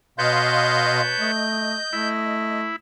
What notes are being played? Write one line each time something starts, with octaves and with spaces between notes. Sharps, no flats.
B2 B4 C#5 D#5 F5 A5 C6 G6
A3 D#5
A3 E4